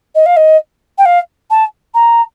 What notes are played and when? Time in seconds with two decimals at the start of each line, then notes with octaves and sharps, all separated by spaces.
0.15 D#5
0.26 F5
0.37 D#5
0.98 G5
1.05 F5
1.51 A5
1.94 A#5